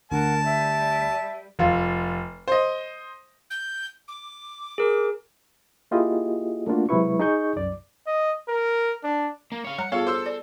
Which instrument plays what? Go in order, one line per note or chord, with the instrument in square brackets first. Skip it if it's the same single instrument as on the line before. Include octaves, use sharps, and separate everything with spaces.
[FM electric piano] D2 [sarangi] A#4 [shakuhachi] F#5 [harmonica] A5
[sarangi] G3 [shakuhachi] E5
[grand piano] F1 F4
C5 D#5
[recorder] G6
D6
[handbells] G#4 A#4
[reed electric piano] A#3 E4 F4 G4 G#4 D#5
A3 A#3 D4 F4 F#4
C3 F#3 G#3 E4 B4 C#6
D#4 G#4 D#5 C#6 G6
C2 F#2 D5
[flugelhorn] D#5
A#4
D4
[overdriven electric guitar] A#3
C#5 F5
[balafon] G3 C#5 A#5 [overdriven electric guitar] F#5
[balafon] B3 F4 G#4 [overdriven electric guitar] A4 [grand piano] C#5 F5
[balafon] F#4 [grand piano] C5 E6
[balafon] D5